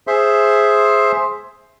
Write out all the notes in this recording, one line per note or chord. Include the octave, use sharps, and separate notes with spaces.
G#4 C5 E5 C6